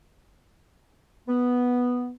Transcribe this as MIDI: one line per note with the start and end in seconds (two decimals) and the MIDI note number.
1.28 2.10 59